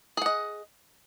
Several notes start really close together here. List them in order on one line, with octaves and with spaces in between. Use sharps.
G#4 F#5 D#5